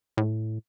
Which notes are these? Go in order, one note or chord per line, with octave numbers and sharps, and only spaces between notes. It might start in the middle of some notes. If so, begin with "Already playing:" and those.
A2